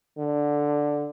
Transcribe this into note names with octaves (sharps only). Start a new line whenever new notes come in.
D3